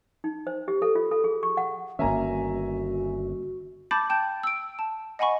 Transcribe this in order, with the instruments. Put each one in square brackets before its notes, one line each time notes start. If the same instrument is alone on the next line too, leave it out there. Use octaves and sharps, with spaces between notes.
[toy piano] D#4
C5
G4
A4
F4
A4
G#4
C#6
F#5
[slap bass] G1 D#3 [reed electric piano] A#3 C#4 [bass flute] F#4 [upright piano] E5 G#5 A#5
[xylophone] A5 B5 D6 G6 A6
G5 A5 G6
E6 D7
A5
D#5 F#5 G#5 B5 C#6